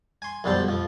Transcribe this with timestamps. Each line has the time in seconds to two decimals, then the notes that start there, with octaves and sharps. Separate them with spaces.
0.22 G#5 C6
0.44 B1 F2 D3 G3 A4 C5
0.68 F2 F3